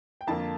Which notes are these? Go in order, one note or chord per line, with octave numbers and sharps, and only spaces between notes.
G5
F2 D3 F3 A#3 A5